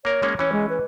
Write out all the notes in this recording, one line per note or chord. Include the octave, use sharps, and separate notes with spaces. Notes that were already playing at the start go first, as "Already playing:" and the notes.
A#3 A#4 C#5
G#3 A#3 C#4
E3 C#4 C#5
G#3
B4